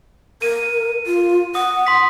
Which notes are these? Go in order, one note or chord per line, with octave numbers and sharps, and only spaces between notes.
A#4 D#7
F4
F#5 D#6
C6 D#6 B6